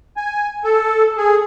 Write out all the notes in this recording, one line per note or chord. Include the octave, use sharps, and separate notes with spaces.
G#5
A4
G#4